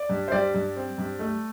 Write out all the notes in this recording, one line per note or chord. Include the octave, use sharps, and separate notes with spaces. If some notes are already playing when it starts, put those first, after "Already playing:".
Already playing: D5
G2
C5
G3 D5
G2
C4
G2
A3